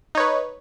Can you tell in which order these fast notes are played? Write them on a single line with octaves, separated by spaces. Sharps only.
D#4 C#5 B4